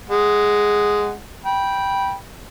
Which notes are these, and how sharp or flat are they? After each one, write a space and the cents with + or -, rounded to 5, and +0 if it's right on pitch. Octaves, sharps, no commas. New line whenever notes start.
G#3 +0 F#5 +0
G5 +0 B5 -15